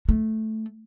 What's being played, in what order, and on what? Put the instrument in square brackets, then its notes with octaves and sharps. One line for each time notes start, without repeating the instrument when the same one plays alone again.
[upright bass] A3